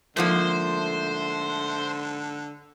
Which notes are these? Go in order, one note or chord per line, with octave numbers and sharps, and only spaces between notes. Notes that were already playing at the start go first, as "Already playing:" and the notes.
G#2 D3 F3 A3 A#3 C5